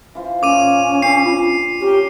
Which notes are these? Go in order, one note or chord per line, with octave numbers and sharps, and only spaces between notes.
E3 F4 C5
A#2 C#4 A#4 D6 D#7
D4 B4 C7
F4
C#4 G4 A#4